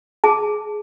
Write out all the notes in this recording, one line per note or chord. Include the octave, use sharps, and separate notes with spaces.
G#4 A5